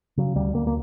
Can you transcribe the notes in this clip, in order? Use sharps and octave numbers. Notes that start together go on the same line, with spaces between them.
C#3 F#3
D2 G3
D2 A#3
A#3